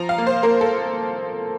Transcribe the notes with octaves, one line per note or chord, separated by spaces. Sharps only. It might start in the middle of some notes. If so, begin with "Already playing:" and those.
Already playing: F3 A#5
F5
A#3
C5
A#3 A#4
A4